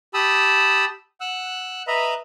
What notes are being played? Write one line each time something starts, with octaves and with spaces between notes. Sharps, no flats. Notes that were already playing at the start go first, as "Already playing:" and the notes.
G4 A5 B5 D#6 E6
F#5 E6 F#6
B4 D#5 E5 A#5 B5